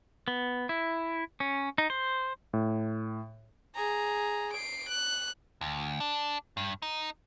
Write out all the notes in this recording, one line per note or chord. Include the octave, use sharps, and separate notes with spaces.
B3
E4
C#4
D#4
C5
A2
G#4 A#5
C7 D7
F#6
D2
D4
G2
D#4